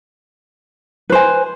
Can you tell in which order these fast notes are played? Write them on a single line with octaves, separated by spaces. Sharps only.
B4 C5 G#5